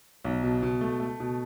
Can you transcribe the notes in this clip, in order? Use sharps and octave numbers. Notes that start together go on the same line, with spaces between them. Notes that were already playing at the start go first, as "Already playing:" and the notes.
B1
B2
B2
A3
A3
B2